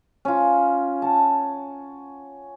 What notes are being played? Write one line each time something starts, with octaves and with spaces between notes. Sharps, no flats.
C#4 F4
F#5 A5